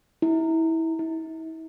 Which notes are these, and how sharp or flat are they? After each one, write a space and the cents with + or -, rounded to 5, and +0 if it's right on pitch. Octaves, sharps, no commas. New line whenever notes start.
E4 -25
E4 -40